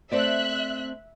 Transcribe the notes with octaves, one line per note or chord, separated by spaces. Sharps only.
A3 C4 D5 E5 F#6